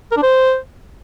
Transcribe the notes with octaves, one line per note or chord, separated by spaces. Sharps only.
A#4
D4
C5